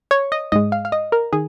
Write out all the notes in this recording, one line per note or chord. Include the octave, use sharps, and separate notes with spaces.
C#5
D#5
G#2 G#3 D#5
F5
F5
D#5
A#4
D#3 G#4